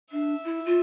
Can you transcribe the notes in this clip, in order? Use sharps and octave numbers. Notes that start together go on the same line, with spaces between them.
D4 E5
E4
F4